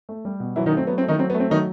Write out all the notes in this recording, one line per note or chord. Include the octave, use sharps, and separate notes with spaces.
A3
G3
B2
E3 F#3 E4
D#3 D#4
A3 C4
F#3 B3
C4
A3
D#3 D#4
F#3 C4
B3
A3
C4
D#3 F#3 D#4